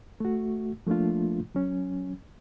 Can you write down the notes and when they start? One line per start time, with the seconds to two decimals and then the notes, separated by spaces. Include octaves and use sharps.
0.20 A3 F#4
0.87 F3 A3 A#3 D4 F4
1.55 F#3 C#4